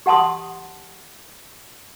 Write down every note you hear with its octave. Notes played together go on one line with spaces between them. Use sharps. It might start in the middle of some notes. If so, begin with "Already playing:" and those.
G4 F#5 A5 C6 D#6